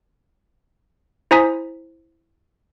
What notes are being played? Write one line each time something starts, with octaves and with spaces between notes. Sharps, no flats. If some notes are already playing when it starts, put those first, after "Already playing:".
E4 C5 G#5 A#5 D#6 B6